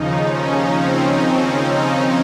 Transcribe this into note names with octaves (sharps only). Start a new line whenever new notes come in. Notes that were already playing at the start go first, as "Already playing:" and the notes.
Already playing: D#2 C#3 F3 D#4
C#4
C4
C4
D#4